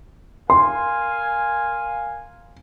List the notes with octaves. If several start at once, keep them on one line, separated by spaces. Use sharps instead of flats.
A#4 F5 G#5 C6